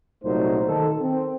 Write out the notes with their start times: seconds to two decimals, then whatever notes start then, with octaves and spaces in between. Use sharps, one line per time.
0.24 C2 A#2 F#3 A3 D#4 C5
0.67 D#3 A4
1.00 C4